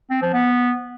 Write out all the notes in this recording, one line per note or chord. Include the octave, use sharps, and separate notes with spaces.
C4
F3
B3